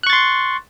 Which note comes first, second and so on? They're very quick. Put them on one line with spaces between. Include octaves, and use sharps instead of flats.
F#6 C#6 A6 C6